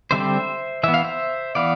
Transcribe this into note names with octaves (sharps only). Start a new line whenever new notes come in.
D3 G3 C4 C5 E5
E3 B3 E5
F5
C5 E5
E3 B3 D5 F5